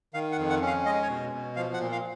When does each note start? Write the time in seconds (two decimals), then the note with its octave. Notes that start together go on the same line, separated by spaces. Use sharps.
0.14 D#3 F5
0.32 F#5
0.38 F2
0.50 F#5
0.62 C#4
0.67 F5
0.85 G#3 D#5
1.03 C#5
1.09 B2
1.33 B2
1.56 F3 F5
1.74 F#5
1.79 A#2
1.92 F5